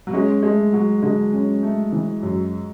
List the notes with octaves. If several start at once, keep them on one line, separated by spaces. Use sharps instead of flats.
F#3
G#3 C#4
G#3 A3
F#3 F#4
D3 G#3
C#4
A3
E3
F#2